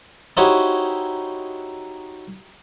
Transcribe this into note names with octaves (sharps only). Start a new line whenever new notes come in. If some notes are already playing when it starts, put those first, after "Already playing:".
D#4 E4 F#4 G4 C5 C#5